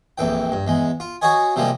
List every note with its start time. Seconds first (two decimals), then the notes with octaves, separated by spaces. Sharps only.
0.18 A#1 F2 E3 G5
0.52 G2
0.67 E2 G#3
1.00 F4
1.22 F#4 G#4 C#5 D#5 G#5
1.56 C3 F3 G3 G#3 A#3